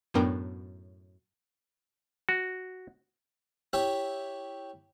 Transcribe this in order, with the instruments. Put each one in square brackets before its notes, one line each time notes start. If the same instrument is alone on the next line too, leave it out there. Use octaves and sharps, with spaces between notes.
[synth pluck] F#2 A2 B3 D4 A#4 G5
[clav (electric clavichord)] F#4
[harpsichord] E4 G4 C#5 E5